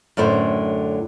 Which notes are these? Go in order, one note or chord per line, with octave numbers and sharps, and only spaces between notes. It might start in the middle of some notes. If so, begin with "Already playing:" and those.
F#2 A2 D3 C5